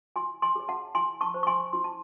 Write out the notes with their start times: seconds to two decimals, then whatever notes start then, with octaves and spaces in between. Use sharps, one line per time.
0.16 E4 G#5 C6
0.42 G#5 C6
0.56 G#4 C#5
0.69 F#5 A5
0.95 E4 G#5 C6
1.21 A5 C#6
1.34 C5
1.43 C#6
1.47 G#5 C6
1.73 E4 C6
1.84 A5